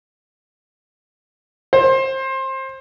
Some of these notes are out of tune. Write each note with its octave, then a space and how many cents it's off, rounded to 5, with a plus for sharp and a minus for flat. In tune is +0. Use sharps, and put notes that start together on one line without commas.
C5 +25